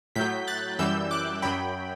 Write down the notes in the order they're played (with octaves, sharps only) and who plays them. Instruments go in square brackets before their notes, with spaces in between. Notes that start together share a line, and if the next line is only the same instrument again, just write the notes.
[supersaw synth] A2 F#3 G6 B6
F#6 A6
F#2 E3 G3 E6 G6
D6 F#6
F#2 F#3 G5 B5